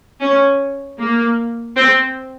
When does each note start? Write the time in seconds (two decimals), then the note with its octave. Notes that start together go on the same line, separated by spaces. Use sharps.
0.21 C#4
0.99 A#3
1.76 C4